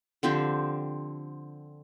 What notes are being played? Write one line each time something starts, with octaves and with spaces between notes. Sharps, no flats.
D3 F3 C4 G4